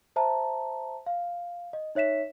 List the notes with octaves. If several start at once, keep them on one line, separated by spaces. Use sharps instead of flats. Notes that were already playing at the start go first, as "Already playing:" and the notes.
C5 E5 A5 A#5
F5
D#5
D#4 C#5 E5 B6 E7